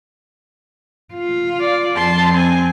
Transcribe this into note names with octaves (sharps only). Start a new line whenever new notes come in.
F4
D5
F2 A5 C6
C4 G#5